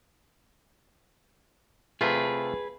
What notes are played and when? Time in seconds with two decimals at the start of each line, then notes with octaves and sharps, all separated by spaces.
2.01 C3 A3 F4 G#4 B4